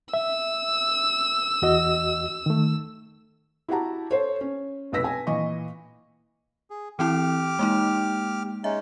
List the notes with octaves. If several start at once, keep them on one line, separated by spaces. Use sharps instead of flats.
E5 E6
E2 F#4 D#5
D#3 A3
E4 F#4 G4 F#5 A5 A#5
A4 C5 C#5
C#4
F1 B1 B4 E6 A#6 B6
G#5
A#2 E3 D#5 C#6
G#4
E3 C4 E4 G4 D6 F6
G#3 A#3 D#4
G#3 C#4 D#4 E5